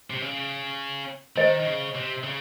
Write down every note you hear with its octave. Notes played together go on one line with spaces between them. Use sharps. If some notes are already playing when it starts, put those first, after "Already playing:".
C3
C#3
D#3 C5 D#5
D#3
C#3
C3
C#3